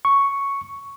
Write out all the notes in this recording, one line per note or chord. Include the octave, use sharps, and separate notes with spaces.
C#6